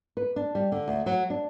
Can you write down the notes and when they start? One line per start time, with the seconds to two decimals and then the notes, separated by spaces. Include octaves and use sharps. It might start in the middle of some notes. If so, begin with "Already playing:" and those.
0.17 B4
0.36 D4
0.55 G3
0.72 D3
0.88 D2
1.06 F#3
1.30 D4